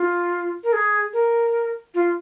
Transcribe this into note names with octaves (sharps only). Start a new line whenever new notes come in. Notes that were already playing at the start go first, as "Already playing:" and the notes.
Already playing: F4
A#4
G#4
A#4
F4